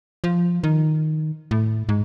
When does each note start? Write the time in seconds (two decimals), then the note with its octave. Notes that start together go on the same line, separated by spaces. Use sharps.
0.24 F3
0.64 D#3
1.51 A2
1.89 G#2